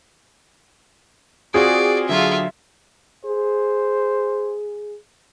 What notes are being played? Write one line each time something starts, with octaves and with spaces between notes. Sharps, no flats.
C4 F4 F#4 G#4 D5
D3 F#3 F4 E5
G#4 C5